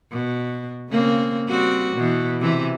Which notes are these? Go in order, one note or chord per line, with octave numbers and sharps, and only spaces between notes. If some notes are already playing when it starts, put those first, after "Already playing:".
B2
C#3 A#3 C4
G3 C4 F#4
B2 E3
C3 E3